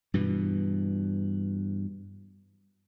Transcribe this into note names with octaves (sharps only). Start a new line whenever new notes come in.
G2 B2 E3